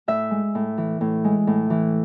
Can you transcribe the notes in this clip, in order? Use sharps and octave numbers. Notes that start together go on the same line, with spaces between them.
A2 E5
G#3
A2
E3
A2
G#3
A2
E3